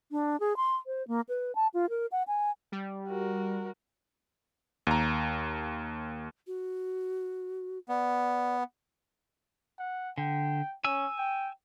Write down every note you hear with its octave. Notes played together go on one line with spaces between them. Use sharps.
D4
G#4
C6
C5
A#3
B4
A5
F4
A#4
F#5
G#5
G3
F#4 A#4
D#2 A#5
F#4
B3 D5
F#5
D3 G5
C#4 G#5 E6
G5